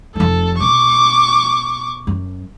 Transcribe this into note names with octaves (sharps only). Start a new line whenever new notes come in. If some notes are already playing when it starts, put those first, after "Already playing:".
F1 F3 A4
B2 C#6 D6
F#2